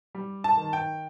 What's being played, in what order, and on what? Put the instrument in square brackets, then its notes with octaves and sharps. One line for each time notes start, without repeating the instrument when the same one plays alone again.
[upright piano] G3
A5
D#3
G5